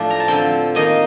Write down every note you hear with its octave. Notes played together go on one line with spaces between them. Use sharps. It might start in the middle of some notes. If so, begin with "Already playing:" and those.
Already playing: A2 F3 A3 D4
A#5
A5
D3 F3 C4 G5
D#3 A#3 D#4 D#5